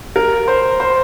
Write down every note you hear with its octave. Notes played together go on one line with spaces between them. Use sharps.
A#4
C5
C5